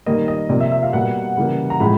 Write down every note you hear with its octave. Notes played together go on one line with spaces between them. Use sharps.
D#3 G3 A#3 D#5
D#5
C3 F3 A#3 D5
E5
E5
F5
B2 G3 A#3 F#5
C#3 E3 G3 A#3
A#5
A2 F3 G#3 B5